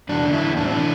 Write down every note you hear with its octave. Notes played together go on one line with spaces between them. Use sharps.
E2 D4
D3
E4
E2
A2 D4
C4
E3 D4